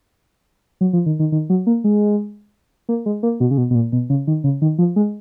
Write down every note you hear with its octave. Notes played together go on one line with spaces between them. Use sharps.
F#3
F3
D#3
D#3
D#3
F#3
A#3
G#3
A#3
G#3
A#3
B2
C#3
B2
B2
A#2
B2
C#3
D#3
C#3
D#3
F3
G#3